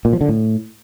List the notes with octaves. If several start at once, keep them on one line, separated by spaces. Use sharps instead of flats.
A#2
F3
D3
A2